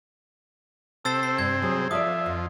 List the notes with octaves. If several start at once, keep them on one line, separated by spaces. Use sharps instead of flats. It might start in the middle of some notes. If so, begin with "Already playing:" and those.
C3 C4 A4 E6 A6 C7
C7
G2 G#4 G#6
F#3 G#4
F3 A4 C#5 D5 E5 D#6
F2